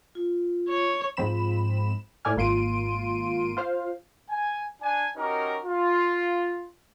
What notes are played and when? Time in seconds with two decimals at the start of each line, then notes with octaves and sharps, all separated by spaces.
0.15 F4
0.69 C#5
1.17 G#2 F3 C4 B5 E7
2.25 A2 A3 D5 G#5 F6
2.37 G#1 A#3 F4 C6 D7 D#7
3.57 F4 C5 F5
4.29 G#5
4.81 D4 G#5
5.16 C#4 D#4 F#4 G4 A#4
5.65 F4